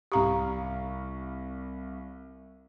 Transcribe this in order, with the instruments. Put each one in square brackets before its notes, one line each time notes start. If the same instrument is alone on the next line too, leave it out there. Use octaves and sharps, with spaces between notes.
[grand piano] C2 F5 C#6 [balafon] G4 A#5